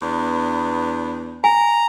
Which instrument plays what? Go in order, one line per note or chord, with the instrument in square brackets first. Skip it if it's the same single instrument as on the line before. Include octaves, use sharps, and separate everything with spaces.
[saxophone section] E2 B3 D4
[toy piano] G#5 [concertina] A#5